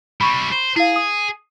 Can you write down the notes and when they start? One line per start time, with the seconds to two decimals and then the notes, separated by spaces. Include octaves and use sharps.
0.21 G3 E4 B5 C#6
0.52 C5
0.76 E4 G#4 F5
0.96 D#6